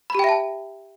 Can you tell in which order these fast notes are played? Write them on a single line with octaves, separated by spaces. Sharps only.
B5 G4 G5 E5 A5